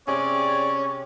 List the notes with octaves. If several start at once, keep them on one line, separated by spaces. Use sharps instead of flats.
C3 C#4 G#4 C#5 D5